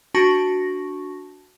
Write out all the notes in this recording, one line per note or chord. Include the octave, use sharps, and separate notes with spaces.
D4 F#4 A5 C#6 A#6